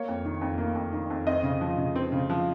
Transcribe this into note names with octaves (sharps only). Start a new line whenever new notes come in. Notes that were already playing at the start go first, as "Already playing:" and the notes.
Already playing: A#3 C#5
F2
D#3
F2
A#3
F2
D#3
F2
C4 D#5
C#3
F3
C#3
C4
C#3
F3